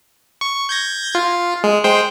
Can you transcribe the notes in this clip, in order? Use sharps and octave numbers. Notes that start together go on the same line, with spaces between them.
C#6
G6 G#6 A#6
F4
G#3
G#3 C5 G5